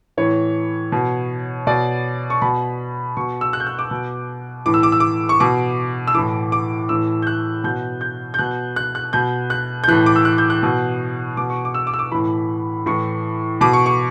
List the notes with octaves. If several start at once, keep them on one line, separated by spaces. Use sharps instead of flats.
A2 E3 C#5
B2
B2 D5
C#6
B2 B5
B2 C#6
E6
F#6
G6
F#6
D6
B2
A2 E3 D6
E6
D6
E6
D6
C#6
B2 D6
E6
A2 E3 D6
D6
A2 E3 E6
G6
F#6
B2 G6
G6
G6
B2 F#6
F#6
F#6
B2 G6
F#6
G6
A2 E3 F#6
D6
E6
F#6
G6
F#6
B2
B2 D6
C#6
D6
E6
D6
E6
D6
A2 E3 B5
A2 E3 C#6
B2 D6
C#6
C#6